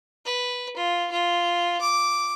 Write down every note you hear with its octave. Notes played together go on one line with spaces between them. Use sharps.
B4
F4
F4
D6